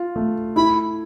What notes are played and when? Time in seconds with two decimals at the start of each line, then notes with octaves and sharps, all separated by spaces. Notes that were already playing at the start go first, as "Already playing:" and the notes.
Already playing: F4
0.16 A3
0.56 E4 B5